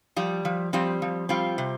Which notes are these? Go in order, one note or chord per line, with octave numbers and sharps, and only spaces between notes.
F3 G3
F3
F3 G3 C4
F3
G3 C4 F4
C3